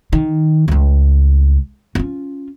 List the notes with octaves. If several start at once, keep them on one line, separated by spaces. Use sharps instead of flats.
D#3
C#2 A3
C#4 F4